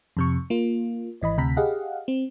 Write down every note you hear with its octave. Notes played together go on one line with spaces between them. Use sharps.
F2 C3 C#6
A#3 F4
G#1 E3 D#5 B5
D2 C3 A#5 B5 B6
G4 G#4 D#5 F5 F#5
C4